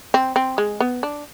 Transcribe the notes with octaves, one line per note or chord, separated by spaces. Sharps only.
C4
C4
G#3
B3
D4